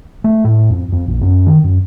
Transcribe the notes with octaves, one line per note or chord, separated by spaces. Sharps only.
A3
A2
F2
F2
A#1
F#2
D#3
F#2